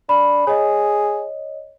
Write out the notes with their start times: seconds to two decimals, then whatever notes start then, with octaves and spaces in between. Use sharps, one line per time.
0.09 D4 B5
0.47 G#4 C#5 D#5